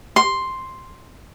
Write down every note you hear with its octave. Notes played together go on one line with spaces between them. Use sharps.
C6